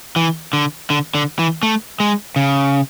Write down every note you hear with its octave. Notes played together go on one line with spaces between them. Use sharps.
E3
D3
D3
D3
E3
A3
G#3
C#3